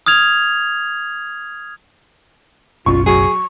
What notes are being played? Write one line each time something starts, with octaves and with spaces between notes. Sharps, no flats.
D#6 F6 G#6 F7
F#1 B1 C#4 F4 C#6
F#3 G#4 C#6